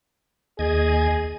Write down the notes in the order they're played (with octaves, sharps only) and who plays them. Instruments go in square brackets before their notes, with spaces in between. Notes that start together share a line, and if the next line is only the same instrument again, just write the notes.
[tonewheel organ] D#2 D#5 G#6 [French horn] G#4